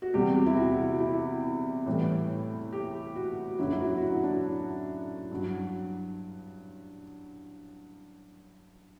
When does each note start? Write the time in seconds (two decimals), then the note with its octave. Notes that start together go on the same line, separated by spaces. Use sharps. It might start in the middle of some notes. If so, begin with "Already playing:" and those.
0.02 F#4
0.14 E2 C3 G3 G4
0.46 E4
0.57 F#4
1.00 E4
1.86 A2 E3 G3
2.72 G4
3.15 F#4
3.59 F#2 D3 F#3 E4
3.71 E4
3.80 F#4
3.97 F#4
4.02 E4
4.23 D4
5.31 G2 F#3